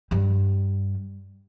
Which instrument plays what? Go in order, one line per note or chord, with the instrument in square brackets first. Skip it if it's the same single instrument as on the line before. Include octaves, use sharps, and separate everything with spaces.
[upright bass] G2 G3